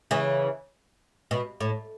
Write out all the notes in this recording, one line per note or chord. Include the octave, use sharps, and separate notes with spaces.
C#3 E3
B2
A2